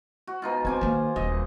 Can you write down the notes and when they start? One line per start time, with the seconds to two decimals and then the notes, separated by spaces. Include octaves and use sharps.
0.27 F#4
0.42 B2 D#4 F4
0.65 C4 C5 G#5 D6
0.81 D#3 A#3
1.16 D#1 G3 D#5